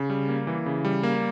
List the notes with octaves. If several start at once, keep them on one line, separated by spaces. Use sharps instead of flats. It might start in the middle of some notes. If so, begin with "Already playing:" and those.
Already playing: C#3
G3
A#3
E3
C#3
G3
A#3